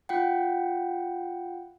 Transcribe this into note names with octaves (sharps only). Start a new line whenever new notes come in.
F4 F#5 G5